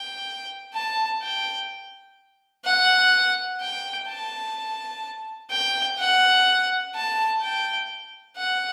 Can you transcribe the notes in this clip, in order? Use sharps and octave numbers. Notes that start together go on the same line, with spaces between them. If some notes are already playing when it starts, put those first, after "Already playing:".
Already playing: G5
A5
G5
F#5
G5
A5
G5
F#5
A5
G5
F#5